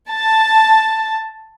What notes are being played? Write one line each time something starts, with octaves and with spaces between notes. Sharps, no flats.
A5